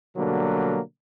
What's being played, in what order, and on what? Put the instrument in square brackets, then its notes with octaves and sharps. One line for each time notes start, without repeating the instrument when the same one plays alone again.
[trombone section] B2 D3 F#3 G3 A#3